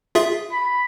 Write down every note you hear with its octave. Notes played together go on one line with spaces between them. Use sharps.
F4 G#4 E5
B5